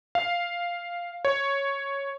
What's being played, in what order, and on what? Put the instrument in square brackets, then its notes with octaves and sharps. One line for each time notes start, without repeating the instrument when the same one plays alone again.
[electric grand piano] F5
C#5